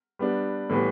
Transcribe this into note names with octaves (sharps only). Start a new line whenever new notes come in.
G3 B3 D4
A2 E3 G3 B3